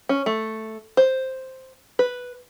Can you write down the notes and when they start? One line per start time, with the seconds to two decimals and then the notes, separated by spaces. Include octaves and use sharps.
0.09 C#4
0.26 A3
0.97 C5
1.99 B4